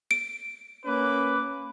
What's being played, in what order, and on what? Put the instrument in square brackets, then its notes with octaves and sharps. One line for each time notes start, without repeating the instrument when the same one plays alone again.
[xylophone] D7
[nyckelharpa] A#3 D6 [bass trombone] C#4 [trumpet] B4